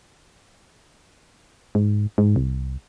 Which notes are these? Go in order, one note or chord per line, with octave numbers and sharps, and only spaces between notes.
G#2
G#2
C2